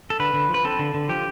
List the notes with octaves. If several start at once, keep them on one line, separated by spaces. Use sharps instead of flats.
A4
D3 B4
D3
F3
B4
C4 A4
D3
D3
F3 G4